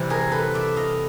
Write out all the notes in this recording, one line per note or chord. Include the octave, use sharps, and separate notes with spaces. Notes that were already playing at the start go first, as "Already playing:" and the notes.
Already playing: C3 E3 G3 C4
G#4 A#4
A4 B4
D5 E5
D#5 F5